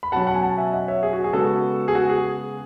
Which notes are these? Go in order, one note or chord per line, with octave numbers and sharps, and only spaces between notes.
B5
B2 F#3 C#4 F#5 A5
F#5 A5
G#5
F#5 A5
E5 G#5
D#5 F#5
C#5 E5
G#4
F#4
G#4
C#3 G#3 B3 F#4 A4
G#4
F#4
G#4